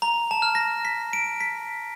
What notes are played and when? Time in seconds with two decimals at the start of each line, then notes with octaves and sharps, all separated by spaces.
0.02 A#5
0.31 A5
0.42 F6
0.55 A#6
0.85 B6
1.13 D7
1.40 B6